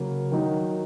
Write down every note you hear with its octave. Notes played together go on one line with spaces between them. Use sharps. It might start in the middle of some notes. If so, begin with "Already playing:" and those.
Already playing: C#3 F#3 A#3
D#3 F#3 D#4